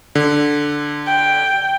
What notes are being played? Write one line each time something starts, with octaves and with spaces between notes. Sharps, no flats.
D3
G5